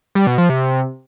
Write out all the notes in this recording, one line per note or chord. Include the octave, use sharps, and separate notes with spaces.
G3
B2
F3
C3